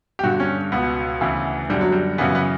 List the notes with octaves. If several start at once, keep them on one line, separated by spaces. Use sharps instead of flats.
G4
G2 D3 F#4
C#4
C#2 B2 B3
D2 C#3 E3
F#2 D3 G3
F#3
G3
F#2 C#3 E3 B3
B3